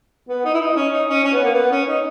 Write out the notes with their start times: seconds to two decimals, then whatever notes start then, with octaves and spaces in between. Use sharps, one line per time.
0.29 B3
0.45 D#4
0.54 E4
0.60 D#4
0.76 C#4
0.92 D#4
1.09 C#4
1.24 C#4
1.33 B3
1.44 A#3
1.54 B3
1.71 C#4
1.88 D#4